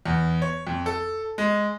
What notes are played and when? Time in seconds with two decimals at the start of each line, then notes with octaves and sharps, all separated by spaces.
0.06 E2
0.42 C#5
0.67 F2
0.86 A4
1.38 G#3